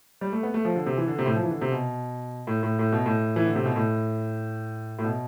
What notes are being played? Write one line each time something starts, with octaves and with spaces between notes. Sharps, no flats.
G3
A3
B3
A3
F3
D3
C3
E3
D3
C3
A2
F3
E3
D3
C3
B2
A2
A2
A2
B2
A2
E3
D3
C3
B2
A2
A2
B2